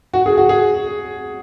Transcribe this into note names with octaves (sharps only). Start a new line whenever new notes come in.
F#4
G#4
F#4
G#4